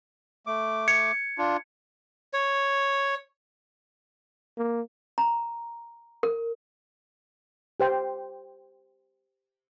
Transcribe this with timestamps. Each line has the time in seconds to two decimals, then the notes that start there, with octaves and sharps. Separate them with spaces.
0.47 A3 D6
0.88 G#6 C#7
1.38 D4 F4
2.33 C#5
4.58 A#3
5.18 A#5
6.23 A#4
7.80 G4 C5 G5